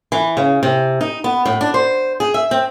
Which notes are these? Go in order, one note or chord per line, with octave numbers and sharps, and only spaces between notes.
E3
C#3
C3
D#4
B3
A2
D4
C5
G#4
E5
C4